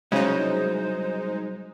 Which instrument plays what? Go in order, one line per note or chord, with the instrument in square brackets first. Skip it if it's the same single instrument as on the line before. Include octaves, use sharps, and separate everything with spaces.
[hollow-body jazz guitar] C2 F#3 E4 [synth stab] C#3 [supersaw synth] G#3 D#4 [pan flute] C5